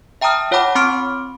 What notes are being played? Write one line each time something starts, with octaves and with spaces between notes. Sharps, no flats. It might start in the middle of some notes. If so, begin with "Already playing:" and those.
E5 G5 A5 A#5 D#6 F6
F4 C#5 F#5 A5 B5 D6
C4 B5 C6 D6 F6 D7